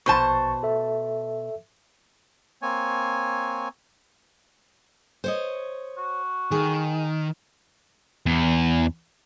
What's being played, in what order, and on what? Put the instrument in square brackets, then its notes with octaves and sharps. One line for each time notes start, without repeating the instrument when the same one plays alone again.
[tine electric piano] A#1 C#6 [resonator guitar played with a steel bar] B2 C5 A5
[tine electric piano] A4 E5
[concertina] A#3 C4 C#5 G#5
[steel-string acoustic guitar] C5 C#5 D#5
[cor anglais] F#4
[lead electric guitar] D#3 [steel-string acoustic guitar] G#4
[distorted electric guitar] E2